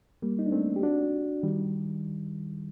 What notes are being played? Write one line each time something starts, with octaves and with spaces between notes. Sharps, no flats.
G3 A#3
D#4
D4
A3 C4
G4
D4 F#4
D#3 G3